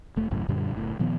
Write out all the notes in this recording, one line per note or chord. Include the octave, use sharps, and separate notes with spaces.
E1 A3
G#1 C#2 F#2 A2
F#2 A#2 D3 G3
F#1 A2
A#2 D#3 F3 B3